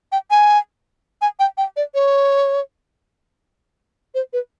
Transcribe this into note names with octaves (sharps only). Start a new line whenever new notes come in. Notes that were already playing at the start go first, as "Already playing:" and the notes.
G5
G#5
G#5
G5
G5
D5
C#5
C5
B4